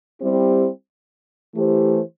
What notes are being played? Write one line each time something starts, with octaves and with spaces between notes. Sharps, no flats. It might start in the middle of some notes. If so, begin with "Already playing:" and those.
G3 C4 E4 G4
E3 A3 E4 G4 C5